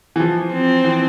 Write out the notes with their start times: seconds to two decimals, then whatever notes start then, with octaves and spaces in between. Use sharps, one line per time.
0.16 E3
0.20 F3
0.53 C4
0.84 E3